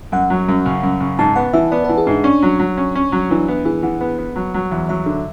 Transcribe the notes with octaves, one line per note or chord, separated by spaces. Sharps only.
F#2 F#5
F#3
F#2
C#3
F#2
C#3
G#2 A5
B3 F#5
E3 E5
B3 D5
E3 B4
G#4
G#2 D4
C#4 D4
F#3
F#3
C#4
C#4
F#3
E3 D4
B3 E4
E3 G#4
E3 F#5
B3
B3
F#3
F#3
E2
F#3 E5
D3